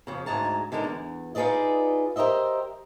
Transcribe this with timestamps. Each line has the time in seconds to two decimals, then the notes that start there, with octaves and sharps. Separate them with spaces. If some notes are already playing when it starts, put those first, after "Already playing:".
0.07 F2 C#3
0.26 D2 G#2 G#3 A5 A#5
0.72 D3 G#3 D#4 A#4
0.84 E2
1.35 D#4 F4 G#4 B4 D5 D#5
2.16 G4 A#4 C5 D#5 E5